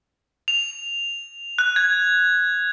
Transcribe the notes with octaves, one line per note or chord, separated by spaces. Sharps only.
F7
F#6
G#6